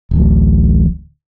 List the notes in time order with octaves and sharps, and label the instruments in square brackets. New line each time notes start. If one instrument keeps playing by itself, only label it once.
[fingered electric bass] D1 A1